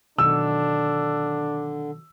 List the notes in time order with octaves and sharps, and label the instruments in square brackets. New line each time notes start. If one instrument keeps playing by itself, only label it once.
[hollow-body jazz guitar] B2 D#3 F#3 [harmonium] D3 [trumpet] D4 [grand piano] E6